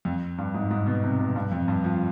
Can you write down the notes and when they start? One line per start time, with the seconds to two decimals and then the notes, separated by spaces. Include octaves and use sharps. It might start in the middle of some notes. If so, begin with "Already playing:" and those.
0.05 F2
0.38 G2
0.54 G#2
0.71 G#2
0.86 B2
1.03 C3
1.19 B2
1.36 G2
1.52 F2
1.68 G2
1.84 F3